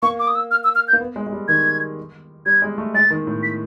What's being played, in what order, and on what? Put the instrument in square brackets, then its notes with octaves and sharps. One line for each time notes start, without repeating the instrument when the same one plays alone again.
[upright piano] A#3 [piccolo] C#6
[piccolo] D6
D#6
E6
F6
E6
F6
G6
[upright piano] A#3
B3
G#3
G#3
G3
[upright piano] D#3 [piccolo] G#6
[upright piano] G3 [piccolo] G#6
[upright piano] G#3
A3
[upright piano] G#3 [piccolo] A6
[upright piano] D#3
A2
[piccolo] B6